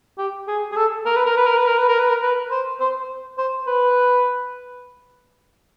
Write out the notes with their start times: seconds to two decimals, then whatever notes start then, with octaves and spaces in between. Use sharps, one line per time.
0.18 G4
0.48 G#4
0.72 G#4
0.76 A4
1.06 A#4
1.16 B4
1.26 A#4
1.37 B4
1.46 A#4
1.57 B4
1.67 A#4
1.78 B4
1.89 A#4
1.99 B4
2.09 A#4
2.23 B4
2.51 C5
2.80 C5
3.38 C5
3.67 B4